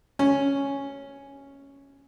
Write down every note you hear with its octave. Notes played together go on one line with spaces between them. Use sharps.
C#4